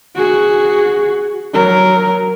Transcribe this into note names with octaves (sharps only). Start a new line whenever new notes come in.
F#4 G#4
F#3 A#4